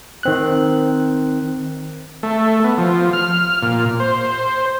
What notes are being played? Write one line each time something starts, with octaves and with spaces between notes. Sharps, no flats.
D#3 C4 F#6
A3
B3
F3
F6
A#2
C5